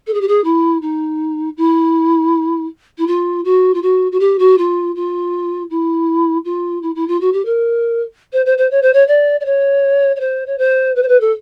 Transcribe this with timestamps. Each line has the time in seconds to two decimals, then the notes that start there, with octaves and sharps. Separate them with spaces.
0.07 A4
0.14 G#4
0.21 G4
0.28 G#4
0.44 E4
0.82 D#4
1.57 E4
2.98 E4
3.07 F4
3.45 F#4
3.74 F4
3.82 F#4
4.12 F#4
4.20 G4
4.39 F#4
4.58 F4
4.95 F4
5.70 E4
6.45 F4
6.82 E4
6.95 E4
7.08 F4
7.21 F#4
7.33 G4
7.45 A#4
8.33 C5
8.46 C5
8.58 C5
8.71 C#5
8.82 C5
8.93 C#5
9.07 D5
9.40 D5
9.45 C#5
10.16 C#5
10.20 C5
10.46 C#5
10.58 C5
10.95 B4
11.03 C5
11.08 B4
11.20 A4